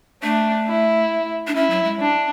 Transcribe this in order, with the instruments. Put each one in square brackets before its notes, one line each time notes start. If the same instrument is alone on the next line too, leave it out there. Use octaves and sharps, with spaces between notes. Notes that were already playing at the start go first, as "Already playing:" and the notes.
[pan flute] A3 [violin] D4
[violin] E4
[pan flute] D4
[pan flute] C#4 [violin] E4
[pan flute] F#3
G#3
[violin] D4